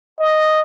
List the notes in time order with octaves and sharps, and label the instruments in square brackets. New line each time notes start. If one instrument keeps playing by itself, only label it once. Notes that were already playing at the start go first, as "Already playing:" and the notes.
[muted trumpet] D#5